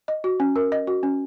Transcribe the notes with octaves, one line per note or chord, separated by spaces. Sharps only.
D#5
F#4
C#4
A#4
D#5
F#4
C#4